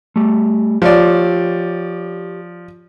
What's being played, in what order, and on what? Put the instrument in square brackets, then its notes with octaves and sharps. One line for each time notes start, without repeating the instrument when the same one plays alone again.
[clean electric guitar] G3 A3
[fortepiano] F3 D5 [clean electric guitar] G4 C#5